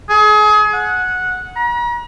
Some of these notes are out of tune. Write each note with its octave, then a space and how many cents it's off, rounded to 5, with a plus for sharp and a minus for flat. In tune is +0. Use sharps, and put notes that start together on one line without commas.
G#4 +30
F#5 -10
A#5 +45